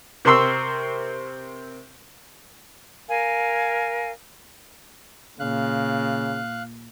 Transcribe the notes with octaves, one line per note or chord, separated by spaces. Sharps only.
C3 C4 A#4 C6 C#6 E6
A#4 F5 G#5
A#2 C#3 F5 F#6